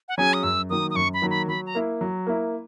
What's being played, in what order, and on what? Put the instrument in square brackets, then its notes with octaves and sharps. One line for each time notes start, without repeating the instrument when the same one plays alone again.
[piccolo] F#5
[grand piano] F#3 C#4 G#4 [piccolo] G#5
[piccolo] D#6
[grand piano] F#2 [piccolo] E6
[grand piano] D#3 F#3 A#3 [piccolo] D#6
[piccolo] D#6
[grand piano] F#2 [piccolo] C#6
[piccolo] B5
[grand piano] D#3 F#3 A#3
[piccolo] B5
[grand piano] F#3 [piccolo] B5
[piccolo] A#5
[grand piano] A#3 E4
F#3
A#3 E4